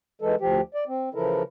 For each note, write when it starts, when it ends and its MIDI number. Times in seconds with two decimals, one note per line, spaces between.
0.22 0.35 52
0.22 0.35 56
0.22 0.35 69
0.41 0.61 38
0.41 0.61 53
0.41 0.61 67
0.74 0.84 74
0.88 1.09 60
1.15 1.43 49
1.15 1.43 52
1.15 1.43 53
1.15 1.43 64
1.15 1.43 69
1.15 1.43 70